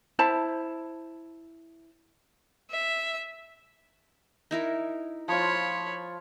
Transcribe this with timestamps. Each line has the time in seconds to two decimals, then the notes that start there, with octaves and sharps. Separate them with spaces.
0.19 E4 C5 A5 B5
2.70 E5
4.51 D#4 E4 A#4
5.28 F3 F4 C#5 B5